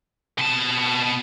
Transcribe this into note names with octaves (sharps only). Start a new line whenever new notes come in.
B2 A5